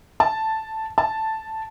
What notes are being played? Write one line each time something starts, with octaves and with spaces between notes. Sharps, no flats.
A5
A5